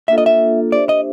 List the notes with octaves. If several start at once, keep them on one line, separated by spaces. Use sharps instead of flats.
A#3 D4 F4 A4 E5
D#5
E5
D4 G4 C5 D5 E5
D#5